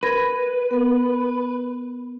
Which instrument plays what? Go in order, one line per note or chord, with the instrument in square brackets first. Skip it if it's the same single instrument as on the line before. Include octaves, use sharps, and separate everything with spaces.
[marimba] A#4 G#6 A#6 [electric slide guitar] B4
[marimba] B3 A#4